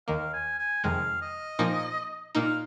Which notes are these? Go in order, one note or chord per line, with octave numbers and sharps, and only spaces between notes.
D#2 D#3 A#3 F5
G#5
G#5
F2 C3 D#3 G#3 F5
D#5
A#2 F3 A#3 D#4
A#2 A#3 D#4 F5